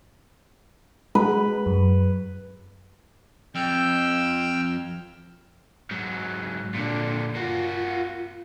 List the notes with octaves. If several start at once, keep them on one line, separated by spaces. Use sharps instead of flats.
G#3 B4
F#2
F2 G5 E6 F6
G#2 F#3
A#2 D3 D4
A#3 F4 F#4